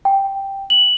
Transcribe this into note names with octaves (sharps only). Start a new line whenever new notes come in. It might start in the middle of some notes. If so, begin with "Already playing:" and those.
G5
F#7